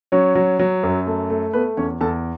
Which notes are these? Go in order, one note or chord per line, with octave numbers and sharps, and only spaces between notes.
F#3 C#4 C#5
F#3
F#3
F#2
A3
A3
A3 B3 B4
E2 C#4 C#5
E2 A4 A5